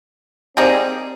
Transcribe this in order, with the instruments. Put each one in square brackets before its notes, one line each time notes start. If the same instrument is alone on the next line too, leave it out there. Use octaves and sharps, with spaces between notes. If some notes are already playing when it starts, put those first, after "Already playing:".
[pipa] G3 A#3 D#4 G#4 [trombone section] C4